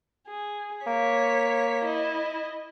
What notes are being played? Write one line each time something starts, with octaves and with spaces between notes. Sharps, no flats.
G#4
A#3 C#5 B6
E4 D#5